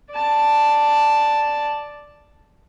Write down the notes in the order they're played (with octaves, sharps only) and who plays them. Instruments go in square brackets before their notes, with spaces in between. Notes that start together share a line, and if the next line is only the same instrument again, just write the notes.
[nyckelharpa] D5 A5